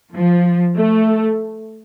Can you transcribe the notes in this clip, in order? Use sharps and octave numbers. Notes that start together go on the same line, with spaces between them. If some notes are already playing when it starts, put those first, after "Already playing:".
F3
A3